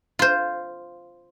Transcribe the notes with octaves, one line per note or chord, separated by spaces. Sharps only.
F4 C5